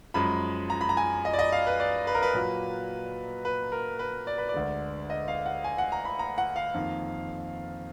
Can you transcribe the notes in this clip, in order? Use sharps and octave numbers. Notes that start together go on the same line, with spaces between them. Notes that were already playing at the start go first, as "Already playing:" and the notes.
F#2 F3 G#3 B5
A#5
B5
A#5
G#5
D#5
D5
D#5
F5
B4
D5
B4
A#4
B4
A#2 F#3 A#3
B4
A#4
B4
D5
B4
D5
D2 D3 G#3
D#5
F5
F#5
G#5
F#5
A#5
B5
A#5
F#5
F5
F2 D#3 A#3